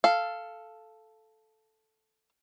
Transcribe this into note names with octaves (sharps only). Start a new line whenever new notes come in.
A4 F5